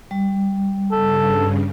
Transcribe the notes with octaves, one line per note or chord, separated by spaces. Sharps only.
G3
G2 C#3 A4